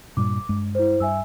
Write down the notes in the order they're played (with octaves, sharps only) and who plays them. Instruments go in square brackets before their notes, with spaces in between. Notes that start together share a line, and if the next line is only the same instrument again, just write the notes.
[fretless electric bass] G2 A#2 G3 [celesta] D6
[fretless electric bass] G2 G#3
[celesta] E4 C5
[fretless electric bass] G2 [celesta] E5 G#5 E6